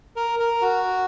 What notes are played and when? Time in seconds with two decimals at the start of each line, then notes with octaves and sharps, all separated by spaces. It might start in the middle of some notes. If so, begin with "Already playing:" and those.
0.16 A#4
0.39 A#4
0.62 F#4